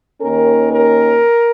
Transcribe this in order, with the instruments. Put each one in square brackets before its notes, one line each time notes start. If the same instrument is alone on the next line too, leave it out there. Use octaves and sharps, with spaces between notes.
[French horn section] D#2 D#3 A#3 C#4 A#4
A#4